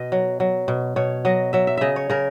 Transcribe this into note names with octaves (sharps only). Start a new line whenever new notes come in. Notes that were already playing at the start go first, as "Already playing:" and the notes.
Already playing: B2 D#5
F#3
F#3
B2
B2 C#5
F#3 D#5
F#3 E5
E5
C#3 D#5 E5
C#5
C#3 A#4